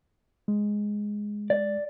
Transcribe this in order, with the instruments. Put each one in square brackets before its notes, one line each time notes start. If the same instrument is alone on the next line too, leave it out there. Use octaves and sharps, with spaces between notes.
[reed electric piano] G#3
[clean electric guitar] D5